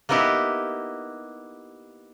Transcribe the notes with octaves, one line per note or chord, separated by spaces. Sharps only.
A#3 B3 D#4 E4 G4